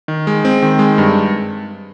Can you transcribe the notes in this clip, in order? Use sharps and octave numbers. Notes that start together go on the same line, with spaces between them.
D#3
G#3
C4
D#3
G#3
G2